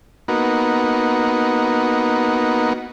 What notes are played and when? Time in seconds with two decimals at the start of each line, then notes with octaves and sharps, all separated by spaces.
0.28 A#3 B3 D#4 F#4